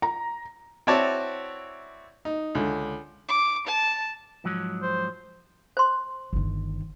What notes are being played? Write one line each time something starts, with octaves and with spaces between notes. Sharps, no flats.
A#5
C4 E4 F#4 C#5 D5 A5
D#4
C#2 D3
D6
A5
G#2 F3 F#3
C5
C5 C6
G1 D#3